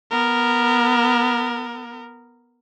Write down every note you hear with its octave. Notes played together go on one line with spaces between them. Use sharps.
B3 A#4